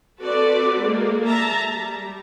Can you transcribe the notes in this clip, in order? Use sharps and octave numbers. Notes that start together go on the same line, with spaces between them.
C4 F#4 A4 B4 D5
G#3 A#3 A4
E5 A5 A#5
G3